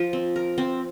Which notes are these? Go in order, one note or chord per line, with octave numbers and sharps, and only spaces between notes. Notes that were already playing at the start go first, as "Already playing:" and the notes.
Already playing: F3
C4
A#4
C4